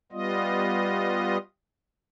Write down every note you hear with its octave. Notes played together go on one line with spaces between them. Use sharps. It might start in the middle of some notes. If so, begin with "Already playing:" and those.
G3 B3 F4 D#5